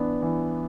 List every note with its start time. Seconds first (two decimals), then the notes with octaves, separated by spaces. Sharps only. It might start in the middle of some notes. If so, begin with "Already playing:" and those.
Already playing: E3 B3 D4
0.22 E3